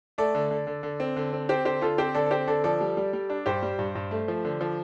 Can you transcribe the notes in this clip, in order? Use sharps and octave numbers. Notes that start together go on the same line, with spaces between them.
A3 A4 D5
D3
D3
D3
D3
C4
D3
C4
C4 G4 C5
D3 G4 C5
D3 F4 A4
C4 G4 C5
D3 A4 D5
A4
C4 G4 C5
D3 A4 D5
F3 A4 D5
G3
G3
G3
D4
G2 G4 C5
G3
G2
G2
A3
F3
D3
F3